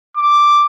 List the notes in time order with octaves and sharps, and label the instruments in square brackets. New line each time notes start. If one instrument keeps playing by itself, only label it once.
[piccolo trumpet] D6